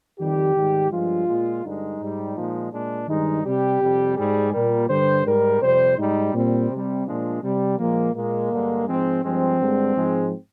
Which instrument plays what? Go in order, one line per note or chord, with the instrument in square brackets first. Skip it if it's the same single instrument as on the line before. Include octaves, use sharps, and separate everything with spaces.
[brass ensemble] F2 D#3 G3 G4
G#2 D#3 G3
G2 F3 G#3 F4
A#2 G#3
G2 D3 G#3 D#4
G#2 G3
A#2 F3 G#3
A#2 G#3 D4
G2 D#3 G#3 D#4
C3 G3 G4
F2 C3 G3
G#2 G3 G#4
A#2 G3 A#4
G2 D3 G3 C5
G#2 G3 A#4
F2 C3 G3 C5
G#2 G3 D#4
A#2 G3 C4
C3 G3
A#2 F3 G#3 D4
C3 G3
A#2 F3 G#3 A#3
A#2 G#3 A#3
G2 D3 G#3
G#2 F3 G#3 C4
G2 F3 G#3 C4
G2 D3 G#3
G#2 F3 G#3